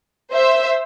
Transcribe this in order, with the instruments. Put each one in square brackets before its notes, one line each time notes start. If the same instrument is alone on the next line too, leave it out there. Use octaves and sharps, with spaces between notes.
[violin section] C5 E5